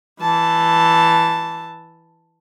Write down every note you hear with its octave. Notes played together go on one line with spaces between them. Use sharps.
E3 A5